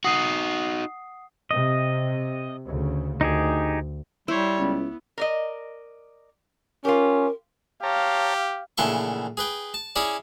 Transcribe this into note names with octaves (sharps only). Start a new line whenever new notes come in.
D#4 F#4 F#5 D#6 C7
C3 D#5
D2 C#3
D2 D#4 G4 G#4
G3 E4 C5 C#5
C#2 B3
A#4 D5 D#5
C#4 F4 G4 A#4
G4 C#5 F5 A5 A#5
A#1 C#3 E3 A3 C6 C#6
G#4 B4 G5
A5
C#4 E4 G#4 C#5 D5